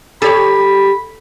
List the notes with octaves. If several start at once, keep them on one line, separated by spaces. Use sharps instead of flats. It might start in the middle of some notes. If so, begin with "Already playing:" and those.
G4 A4 C#5 B5